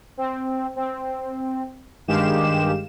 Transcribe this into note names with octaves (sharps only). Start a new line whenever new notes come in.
C4
C4
G2 D#3 G#3 G4 F5 E7